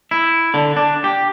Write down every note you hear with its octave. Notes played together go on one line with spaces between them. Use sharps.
E4
D3
D4
G4